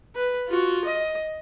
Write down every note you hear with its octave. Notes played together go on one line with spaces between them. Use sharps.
B4
F4 F#4
D#5